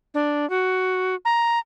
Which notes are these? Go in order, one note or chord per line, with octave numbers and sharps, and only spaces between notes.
D4
F#4
A#5